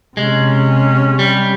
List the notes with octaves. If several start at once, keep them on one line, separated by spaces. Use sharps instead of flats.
C3 G#3 C#4
G3